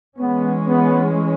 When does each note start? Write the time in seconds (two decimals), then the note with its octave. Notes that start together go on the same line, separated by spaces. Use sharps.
0.18 E3 G#3 B3 C#4
0.68 B3